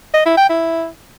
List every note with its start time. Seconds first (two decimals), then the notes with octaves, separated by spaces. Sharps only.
0.14 D#5
0.25 E4
0.37 G5
0.49 E4